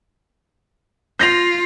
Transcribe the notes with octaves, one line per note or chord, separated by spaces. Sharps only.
F4 G6 A#6 F7